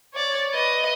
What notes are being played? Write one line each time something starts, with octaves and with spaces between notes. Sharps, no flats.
C#5 D5
B4 D#5